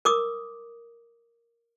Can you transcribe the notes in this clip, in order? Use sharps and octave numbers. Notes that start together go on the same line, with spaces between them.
A#4 D6 D#6